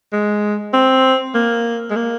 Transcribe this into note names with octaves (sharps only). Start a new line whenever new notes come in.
G#3
C4
A#3
G#3
A#3